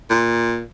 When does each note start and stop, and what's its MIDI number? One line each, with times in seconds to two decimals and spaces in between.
0.10 0.63 46